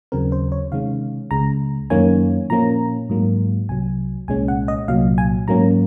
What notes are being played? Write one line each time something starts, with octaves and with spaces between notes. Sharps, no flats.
D#2 C#3 F#3 C4 A#4
C5
C#5
C3 D#3 G#3 C#4 F5
C#2 C#3 G#3 A#5
F#2 D#3 A#3 C#4 G#5
A#2 F3 A#3 C#4 A#5
G#2 F#3 A#3
C2 C3 F#3 G#5
C2 A#2 G#3 C#4 G#5
F#5
D#5
C2 A#2 F#3 F5
G#5
G#2 F#3 A#3 C#4 A#5